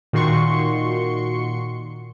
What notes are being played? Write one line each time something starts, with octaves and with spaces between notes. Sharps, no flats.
A#2 D#3 F#4 C6 C#6 C#7